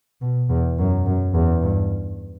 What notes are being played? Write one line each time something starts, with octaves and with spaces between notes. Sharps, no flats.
B2
E2
F#2
F#2
E2
G2